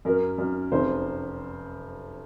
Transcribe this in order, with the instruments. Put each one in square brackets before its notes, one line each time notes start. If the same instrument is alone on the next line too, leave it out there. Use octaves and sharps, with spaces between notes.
[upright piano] F#2 A#4
F#2
F1 C5